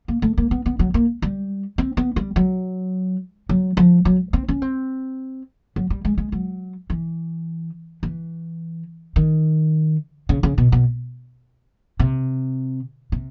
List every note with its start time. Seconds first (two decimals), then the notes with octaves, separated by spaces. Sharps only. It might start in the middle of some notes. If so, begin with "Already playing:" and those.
0.08 A#3
0.22 A3
0.37 A#3
0.51 B3
0.66 B3
0.79 F#3
0.94 A#3
1.22 G3
1.78 C4
1.97 B3
2.16 G3
2.36 F#3
3.49 F#3
3.77 F3
4.05 F#3
4.33 C4
4.48 C#4
4.62 C4
5.76 F#3
5.90 G3
6.05 G#3
6.18 G#3
6.32 F#3
6.90 E3
8.03 E3
9.16 D#3
10.29 C#3
10.43 C#3
10.58 B2
10.72 B2
11.99 C3
13.12 C3